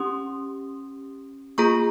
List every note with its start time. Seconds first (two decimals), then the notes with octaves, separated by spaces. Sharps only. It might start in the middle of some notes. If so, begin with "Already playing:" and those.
Already playing: C#4 G4 C6 D#6
1.58 A#3 F4 G#4 A#5 C#6